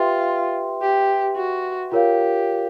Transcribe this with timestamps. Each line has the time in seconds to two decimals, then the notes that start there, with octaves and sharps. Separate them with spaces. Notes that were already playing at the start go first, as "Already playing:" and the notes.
Already playing: F4 G4 B4 E5 G5 C6
0.82 G4
1.37 F#4
1.92 F4 G4 A#4 C#5 F5